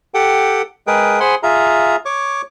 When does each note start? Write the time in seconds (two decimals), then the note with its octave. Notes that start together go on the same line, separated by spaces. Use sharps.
0.14 G4 A4 F#5 G5
0.87 G#3 G#4 A#4 B4 G5
1.20 G#4 C5 F#5 G#5 B5 C6
1.43 F4 G#4 E5 F5 A#5
2.05 C#5 C#6 D6